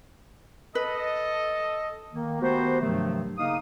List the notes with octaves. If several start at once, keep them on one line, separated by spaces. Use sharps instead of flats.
A4 B4 D#5
D#3 A#3
D#3 A3 B3 F#4 G4 C5
G2 C3 D#3 F3 F#3 A3
C#3 A#3 D#4 F5 D#6